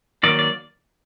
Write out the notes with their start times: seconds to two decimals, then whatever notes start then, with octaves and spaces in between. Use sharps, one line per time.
0.23 D#3 F#3 A#3 D5
0.39 D5